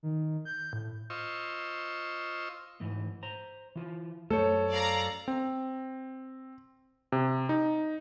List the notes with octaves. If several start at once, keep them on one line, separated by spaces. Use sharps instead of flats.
D#3
G6
A2
F4 C5 D#5 C#6 E6
G#2 E3 A3
C5 A#5
E3 F4
F#2 A3 A4 C5 C#5
D5 F5 A#5
C4
C3
D#4